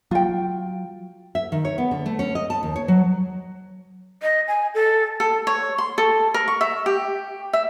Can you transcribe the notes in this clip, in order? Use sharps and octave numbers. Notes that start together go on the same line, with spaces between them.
F#3 F4 G5
E5
D#3
C#5
B3
D3
A3
C#4
D#5
A5
D#2
C#5
F#3
D#5
G#5
A4
A4
C#5
C6
A4
A#4
C#6
E5
G4
E5